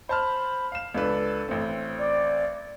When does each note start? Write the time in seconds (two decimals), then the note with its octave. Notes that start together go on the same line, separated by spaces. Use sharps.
0.09 C5 A5 B5 F6
0.72 F5 E7
0.95 C#2 D4 A4 B4
1.49 A1 C4
1.99 D5